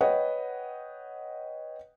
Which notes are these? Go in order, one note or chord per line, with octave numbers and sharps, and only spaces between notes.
B4 C#5 D#5 F#5 G5